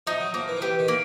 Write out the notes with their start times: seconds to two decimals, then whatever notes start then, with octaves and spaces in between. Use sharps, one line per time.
0.07 F3 D#4
0.20 F#3
0.34 F3 A#3
0.48 E3
0.57 F3
0.61 E3 G4
0.79 D#3
0.88 A#3